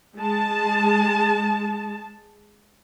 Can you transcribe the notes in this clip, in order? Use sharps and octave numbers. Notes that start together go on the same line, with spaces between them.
G#3 A5